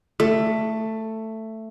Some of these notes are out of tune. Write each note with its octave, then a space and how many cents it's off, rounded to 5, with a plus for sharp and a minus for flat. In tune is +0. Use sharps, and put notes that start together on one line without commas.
A3 +10